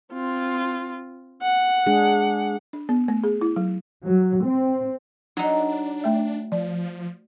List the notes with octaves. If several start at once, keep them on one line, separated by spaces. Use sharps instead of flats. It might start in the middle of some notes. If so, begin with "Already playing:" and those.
C4 F4
F#5
G#3 D4 G#4
D4
B3
A3
G#4
E4
F#3
F#3
C4
F#3 D4 D#4
A3 E5
F3 D5